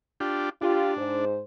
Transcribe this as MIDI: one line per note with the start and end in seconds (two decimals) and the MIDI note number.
0.20 0.49 62
0.20 0.49 65
0.20 0.49 67
0.62 1.25 62
0.62 0.93 65
0.62 0.93 67
0.97 1.42 44
0.97 1.42 72